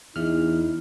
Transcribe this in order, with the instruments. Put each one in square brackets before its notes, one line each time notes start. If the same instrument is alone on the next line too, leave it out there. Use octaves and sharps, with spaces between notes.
[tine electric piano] E2 F6 [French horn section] D#4 E4